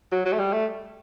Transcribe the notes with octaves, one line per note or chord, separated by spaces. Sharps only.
F#3
F#3
A3
G3
A3